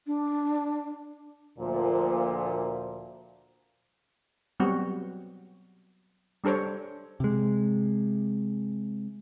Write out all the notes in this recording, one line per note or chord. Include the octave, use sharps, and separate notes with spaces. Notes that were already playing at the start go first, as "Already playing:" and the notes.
D4
D2 A#2 F3
F#3 G3 B3 C4 F#4
G3 D4 A4 C5 C#5
C3 G#3